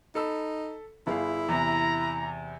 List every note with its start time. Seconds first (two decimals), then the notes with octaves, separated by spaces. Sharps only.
0.15 D#4 A4 B5 E6
1.07 G1 E4 G#4 F5
1.49 E2 C3 A#5